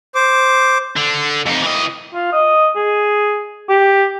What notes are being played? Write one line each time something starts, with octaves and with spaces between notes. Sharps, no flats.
C5 D6
D3
F2 D#4
E3 D#5
F4
D#5
G#4
G4